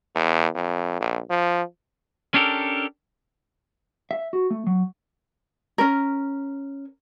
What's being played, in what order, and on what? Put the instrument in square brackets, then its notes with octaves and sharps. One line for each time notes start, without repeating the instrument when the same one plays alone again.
[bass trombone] E2
F2
A#1
F3
[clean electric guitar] C#4 D4 G4 A4 A#4
E5
F#4
A3
F#3
[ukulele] C#4 A#4